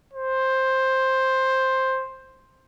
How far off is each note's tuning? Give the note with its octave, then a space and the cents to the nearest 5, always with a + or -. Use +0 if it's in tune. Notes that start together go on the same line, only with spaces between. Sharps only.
C5 +10